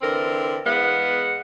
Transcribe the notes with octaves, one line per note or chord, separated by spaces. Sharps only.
D3 E3 C4 A#4
E2 G#3 B3 F5 F#5